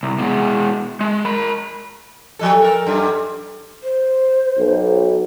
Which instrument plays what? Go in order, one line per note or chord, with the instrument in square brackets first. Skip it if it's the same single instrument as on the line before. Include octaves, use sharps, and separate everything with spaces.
[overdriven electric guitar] C2
B2 G#3
G#3
A#4 B5
[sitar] F3 G3 A4
A4 A#4
F#2 G3
[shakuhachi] C5
[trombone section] B1